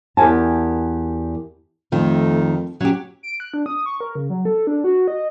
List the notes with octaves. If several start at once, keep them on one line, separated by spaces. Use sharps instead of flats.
E2 G4 A#4 G#5 A5
F2 D#3 A3
F#3 C#4 G4
D7
F#6
D4
D#6
C#6
A#4
C#3
F#3
A4
D4
F#4
D#5